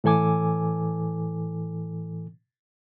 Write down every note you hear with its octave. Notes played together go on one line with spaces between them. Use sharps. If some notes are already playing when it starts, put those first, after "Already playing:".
A2 E3 A4 G#5 D6